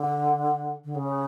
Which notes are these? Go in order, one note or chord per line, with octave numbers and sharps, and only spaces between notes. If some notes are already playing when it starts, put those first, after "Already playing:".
Already playing: D3
D3
C#3